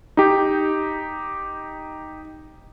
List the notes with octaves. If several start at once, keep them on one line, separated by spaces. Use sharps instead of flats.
D#4 G4